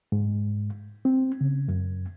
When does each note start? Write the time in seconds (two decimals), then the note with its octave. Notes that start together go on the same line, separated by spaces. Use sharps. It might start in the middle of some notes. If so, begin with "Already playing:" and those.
0.12 G#2
1.05 C4
1.41 C#3
1.68 F#2